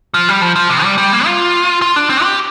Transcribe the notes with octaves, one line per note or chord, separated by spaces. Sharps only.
F3
G3
F3
F3
C3
G3
G3
A#3
F4
F4
D4
C4
G4